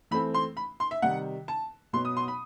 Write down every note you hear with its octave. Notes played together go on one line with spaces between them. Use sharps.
E3 A3 C4 B5
C6
B5
C6
E5
C3 D#3 G3 F#5
A5
B2 F#3 B3 C6
D#6
C6
B5